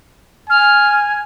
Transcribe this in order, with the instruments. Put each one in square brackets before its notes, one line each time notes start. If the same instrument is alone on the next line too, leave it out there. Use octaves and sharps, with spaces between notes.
[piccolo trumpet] G#5 [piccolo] F6